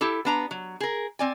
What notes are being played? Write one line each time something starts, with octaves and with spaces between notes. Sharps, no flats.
E4 G4 A4
B3 D4 A#5
F#3
G#4 A#4
C4 D5 G#5